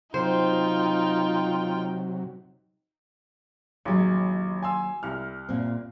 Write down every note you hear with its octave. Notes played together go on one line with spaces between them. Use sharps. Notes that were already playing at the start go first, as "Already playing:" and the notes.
C3 F#3 D#4 F4 C5 G5
A1 D#2 F#3 G#3
G#5 C6 E6
C2 F6
A#2 C4